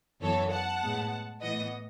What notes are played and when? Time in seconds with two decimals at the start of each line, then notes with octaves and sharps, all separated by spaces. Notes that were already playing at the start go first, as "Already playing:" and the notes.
0.21 F#2 E3 B3 A4 C#5
0.51 F#5 A5
0.81 A2 G#3 B3
1.41 A2 E3 B3 D#5 F#5